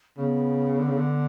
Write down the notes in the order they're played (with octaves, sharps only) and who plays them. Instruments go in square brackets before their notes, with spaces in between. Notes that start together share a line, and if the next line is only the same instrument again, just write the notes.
[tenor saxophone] C#3 [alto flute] B3
[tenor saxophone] D3
C#3
D3